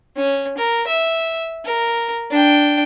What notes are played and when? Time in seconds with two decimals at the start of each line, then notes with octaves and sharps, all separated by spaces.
0.17 C#4
0.57 A#4
0.88 E5
1.65 A#4
2.31 D4 G5